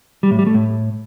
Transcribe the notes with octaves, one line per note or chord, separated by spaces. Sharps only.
G3
A2
G3
A3
A2